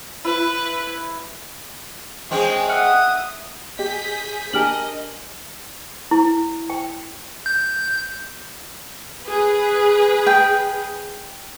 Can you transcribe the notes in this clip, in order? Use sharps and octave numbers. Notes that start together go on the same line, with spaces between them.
E4 B4
G#3 C4 C#4 G#4
E5 F#5 D#6 F6 F#6
G4 G#4 D#5 G6 B6
D4 G4 A#4 D#5 G#5 F6 F#7
E4
G5
G6
G#4 B4
G5